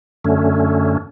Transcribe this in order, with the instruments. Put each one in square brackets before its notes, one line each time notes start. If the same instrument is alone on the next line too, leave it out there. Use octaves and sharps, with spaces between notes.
[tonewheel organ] F#2 D3 A3 C#4